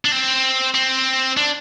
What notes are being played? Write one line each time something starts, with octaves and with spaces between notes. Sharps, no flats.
D4
C4
C4
D4